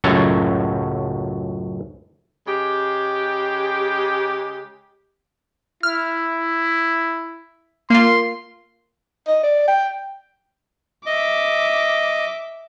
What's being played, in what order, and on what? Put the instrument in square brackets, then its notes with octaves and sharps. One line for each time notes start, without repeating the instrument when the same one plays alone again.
[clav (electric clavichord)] C#2 F#2 A2 F#3 A4 C#5
[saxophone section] C#3 G#3 G4
[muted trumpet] E4 [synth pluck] F6
[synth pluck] A#3 F4 [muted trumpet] C6
[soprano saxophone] D#5
D5
G5
[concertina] D#5 [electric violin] E5 D6